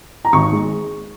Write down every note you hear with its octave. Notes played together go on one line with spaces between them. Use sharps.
A#5
G#1 C#6
G#3